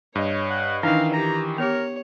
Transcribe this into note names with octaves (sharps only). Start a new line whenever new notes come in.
G2 C#5 D#5
F#5
D#3 E3 D4 D#4 A#4 F5
G4 A#5
B3 G4 A#4 C#5